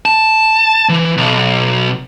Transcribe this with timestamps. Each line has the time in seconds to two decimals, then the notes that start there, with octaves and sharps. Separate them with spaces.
0.06 A5
0.89 E3
1.17 B1